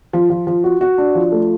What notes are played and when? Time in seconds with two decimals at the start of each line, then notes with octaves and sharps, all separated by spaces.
0.13 F3
0.30 F3
0.47 F3
0.64 F#4
0.81 F#4
0.98 D4
1.15 F3
1.32 A3